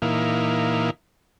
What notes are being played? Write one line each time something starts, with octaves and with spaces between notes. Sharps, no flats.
A#2 E3 A#3 D#4 E4 F5